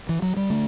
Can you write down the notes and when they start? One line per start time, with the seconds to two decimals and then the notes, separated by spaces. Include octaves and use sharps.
0.09 E3
0.22 F#3
0.37 G3
0.50 D3 A3